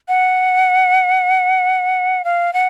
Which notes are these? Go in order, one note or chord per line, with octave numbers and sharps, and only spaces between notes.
F#5
F5
F#5